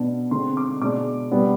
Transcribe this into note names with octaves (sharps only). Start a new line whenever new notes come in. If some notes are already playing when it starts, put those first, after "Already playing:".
Already playing: B2 B3 D4
D3 G#3 C4 C6
D6
B2 G#3 D4 D6
B2 G3 B3 D4